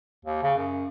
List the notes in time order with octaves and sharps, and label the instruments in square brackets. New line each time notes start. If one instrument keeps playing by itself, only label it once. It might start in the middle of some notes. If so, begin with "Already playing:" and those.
[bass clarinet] D#2
C#3
F#2